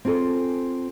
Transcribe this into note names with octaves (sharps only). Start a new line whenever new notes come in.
C4 F4 G#4 A4